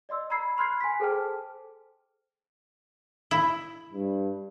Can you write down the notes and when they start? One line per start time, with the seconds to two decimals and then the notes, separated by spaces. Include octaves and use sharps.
0.09 D5 D#5 C6 E6
0.30 A#5 B5 E6 G#6 C7
0.57 B5 C6 F6 F#6 G#6 C7
0.81 G#5 C6 B6
1.00 G#4 A4 C5 G5 A5 F6
3.31 E4
3.93 G2